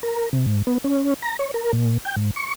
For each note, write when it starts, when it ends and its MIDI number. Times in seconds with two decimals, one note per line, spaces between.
0.03 0.29 70
0.33 0.46 48
0.46 0.62 44
0.67 0.78 59
0.84 1.14 61
1.22 1.37 82
1.39 1.51 73
1.54 1.72 70
1.73 1.98 46
2.05 2.15 79
2.16 2.31 44
2.36 2.53 85